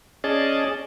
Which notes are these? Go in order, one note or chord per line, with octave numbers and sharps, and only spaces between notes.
C#4 G#4 D5 D#5 A5